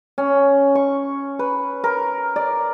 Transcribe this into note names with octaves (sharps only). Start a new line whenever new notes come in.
C#4
C#6
B4
A#4
D5